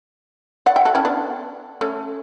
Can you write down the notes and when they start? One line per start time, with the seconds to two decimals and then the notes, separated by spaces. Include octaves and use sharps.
0.66 D5 F#5
0.76 E5 G5
0.85 F#4 A4
0.95 C#4 E4
1.05 B3 D4
1.81 A3 C#4